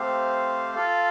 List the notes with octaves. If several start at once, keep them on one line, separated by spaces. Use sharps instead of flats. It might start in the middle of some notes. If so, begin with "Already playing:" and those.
Already playing: A3 C4 G4 C5 F5
F4 A4 F5